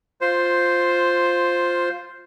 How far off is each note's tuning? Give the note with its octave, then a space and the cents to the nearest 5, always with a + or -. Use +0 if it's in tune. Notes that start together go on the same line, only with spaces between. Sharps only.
F4 +5 C5 +0